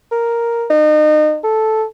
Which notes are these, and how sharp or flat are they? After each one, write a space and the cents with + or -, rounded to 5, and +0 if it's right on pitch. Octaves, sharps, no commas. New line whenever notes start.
A#4 +0
D#4 -35
A4 -5